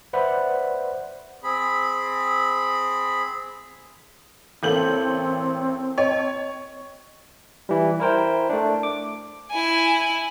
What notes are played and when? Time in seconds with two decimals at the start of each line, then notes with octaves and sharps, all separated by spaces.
0.13 B4 C5 D5 E5 F#5 B5
1.44 C4 G#4 B5
4.63 A1 A#3 C4 A4 G6 F#7
5.98 C#5 D#5 G5 A5
7.69 E3 G3
8.00 E4 A#4 C5 G5
8.50 A3 D4
8.83 D6
9.51 E4 G#5